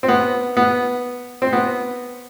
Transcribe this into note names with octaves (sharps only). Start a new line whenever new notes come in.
C4
B3
B3
C4
B3